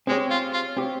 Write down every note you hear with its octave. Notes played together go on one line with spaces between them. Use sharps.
G#3 C4 G4 C#5
F4
F4
C4 G4 C#5